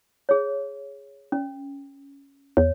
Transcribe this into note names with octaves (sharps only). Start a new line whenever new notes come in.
G#4 C#5
C#4
E2 C#5